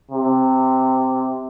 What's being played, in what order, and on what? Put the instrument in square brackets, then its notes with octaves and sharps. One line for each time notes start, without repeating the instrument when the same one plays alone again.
[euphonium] C3